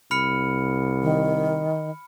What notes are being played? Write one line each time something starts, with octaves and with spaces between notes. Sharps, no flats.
C2 B5 F6 C#7
D#3